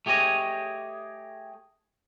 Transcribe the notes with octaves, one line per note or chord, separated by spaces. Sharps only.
A3 G4 G#4 C#5 D#5